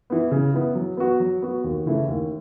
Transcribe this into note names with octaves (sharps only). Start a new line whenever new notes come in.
E3 B3
C#3
E3 B3
F#3
B3 F#4
F#3
B3 F#4
D#2
C#3 E3 A3
D#2